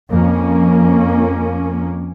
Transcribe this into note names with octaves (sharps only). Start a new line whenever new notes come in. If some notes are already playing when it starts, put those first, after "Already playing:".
F2 A#3 C#4